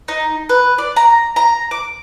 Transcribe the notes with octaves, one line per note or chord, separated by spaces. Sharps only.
D#4
B4
D5
A#5
A#5
D6